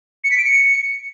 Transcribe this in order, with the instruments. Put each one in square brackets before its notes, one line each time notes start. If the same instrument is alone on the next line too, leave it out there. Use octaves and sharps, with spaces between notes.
[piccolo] C#7
B6
D7
C#7